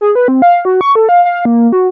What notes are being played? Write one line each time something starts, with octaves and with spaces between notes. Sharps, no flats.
G#4
B4
C4
F5
F#4
C#6
A4
F5
F5
A#3
F#4